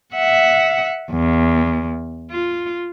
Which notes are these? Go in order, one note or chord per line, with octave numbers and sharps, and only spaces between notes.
E5 F#5
E2
F4